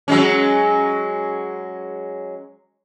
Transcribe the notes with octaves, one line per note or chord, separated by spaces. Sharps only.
F#3 G#3 C#4